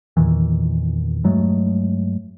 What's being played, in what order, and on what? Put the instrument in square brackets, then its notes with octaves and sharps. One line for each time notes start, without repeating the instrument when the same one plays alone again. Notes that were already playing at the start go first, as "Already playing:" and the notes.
[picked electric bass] E2 A#2 D#3 E3
G2 F#3 G#3 A3